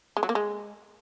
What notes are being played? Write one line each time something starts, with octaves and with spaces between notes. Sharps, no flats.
G#3
F#3
A#3
G#3